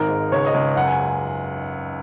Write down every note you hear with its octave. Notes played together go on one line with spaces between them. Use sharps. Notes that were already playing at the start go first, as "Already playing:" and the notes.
Already playing: G#1 A#4
G#2
C#2 C#5
D#5
C#2
F#2 F#5
G#5